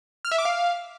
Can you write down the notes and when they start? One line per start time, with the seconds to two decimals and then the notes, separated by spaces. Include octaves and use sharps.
0.25 F6
0.31 E5
0.38 D6
0.45 F5